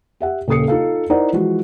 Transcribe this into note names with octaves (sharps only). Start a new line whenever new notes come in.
G4 E5 F#5
D#1 C#3 A4 D#6 C7 C#7
D#4 F4 A4 F5
D#4 E4 A#4 C5 D5 F#5
E3 F3 G#3 F#4